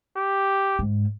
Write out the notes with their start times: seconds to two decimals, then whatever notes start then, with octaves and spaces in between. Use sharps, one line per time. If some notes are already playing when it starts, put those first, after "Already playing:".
0.16 G4
0.79 G#2